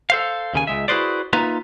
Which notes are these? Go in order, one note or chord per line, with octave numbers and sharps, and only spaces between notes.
A4 C5 F5
D#2 C#3 G#5
C#2 G#3 E5
E4 F#4 G#4 B4 C5 D5
A#3 D#4 F4 B4 E5 A#5